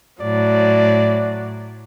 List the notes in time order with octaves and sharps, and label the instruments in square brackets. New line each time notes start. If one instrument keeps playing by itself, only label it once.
[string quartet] A2 F#3 [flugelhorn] D5